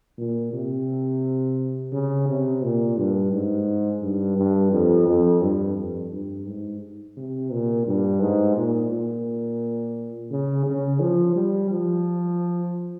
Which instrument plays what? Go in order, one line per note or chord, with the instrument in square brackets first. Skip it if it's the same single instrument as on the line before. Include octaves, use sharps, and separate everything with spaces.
[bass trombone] A#2
C3
C#3
C3
A#2
G2
G#2
G2
G2
F2
F2
G2
F2
G2
G#2
C3
A#2
G2
G#2
A#2
A#2
C#3
C#3
F3
G3
F3